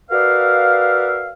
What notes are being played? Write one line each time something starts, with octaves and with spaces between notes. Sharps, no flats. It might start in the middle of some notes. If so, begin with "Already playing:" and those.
F#4 A#4 B4 D5 E5 F5